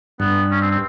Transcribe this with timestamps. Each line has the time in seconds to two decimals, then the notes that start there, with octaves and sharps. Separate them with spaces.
0.20 G2 B3
0.51 C#4
0.61 C4
0.71 C4